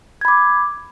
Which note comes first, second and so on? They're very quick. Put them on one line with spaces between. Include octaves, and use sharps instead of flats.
G#6 B5 D6